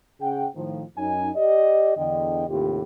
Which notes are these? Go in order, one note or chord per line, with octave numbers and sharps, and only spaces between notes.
C#3 C#4 G#4 F#5 G5
A2 D#3 F3
F#2 C#4 D#4 G#5
G4 D5 D#5
E2 D3 D#5 G5
D#2 A2 C3 F4 G4